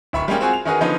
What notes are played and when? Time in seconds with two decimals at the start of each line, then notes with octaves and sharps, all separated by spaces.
0.13 D1 E5 B5 C#6
0.28 G3 G#3 A#3 C#4 G5
0.41 C4 F4 F#4 G#4 G#5
0.53 F7
0.65 D#3 C#4 D#4 F#4 G#4 B4
0.81 D3 F3 B3 C#4 D#4 B4